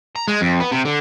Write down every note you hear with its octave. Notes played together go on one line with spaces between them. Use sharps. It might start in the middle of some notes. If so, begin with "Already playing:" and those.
A#5
G#3
F2
B3
C3
D3